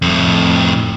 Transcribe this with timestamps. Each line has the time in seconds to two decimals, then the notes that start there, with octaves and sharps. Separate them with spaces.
0.02 F2 A2